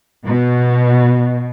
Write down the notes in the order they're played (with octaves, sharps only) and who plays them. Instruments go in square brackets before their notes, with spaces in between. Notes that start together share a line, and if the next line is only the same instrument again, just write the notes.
[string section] B2